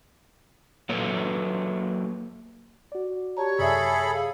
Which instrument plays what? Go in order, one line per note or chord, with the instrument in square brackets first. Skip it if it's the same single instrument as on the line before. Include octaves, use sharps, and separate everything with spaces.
[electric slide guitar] F#3 A#3 A4 B4 C#5
[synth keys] F#4 D5
[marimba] G4 A5 A#5 [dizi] C#5
[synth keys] F#2 C3 [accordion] G#4 A4 B5 [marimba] D5 E5
[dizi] G#4 [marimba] F5